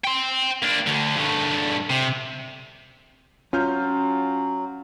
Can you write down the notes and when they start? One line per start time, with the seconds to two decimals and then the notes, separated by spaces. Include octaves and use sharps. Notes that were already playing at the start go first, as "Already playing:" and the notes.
0.05 G5 C6
0.62 A#3 D4
0.86 D2 D3
1.16 G2 A3
1.90 C3
3.53 F#3 C#4 F4 F6 G6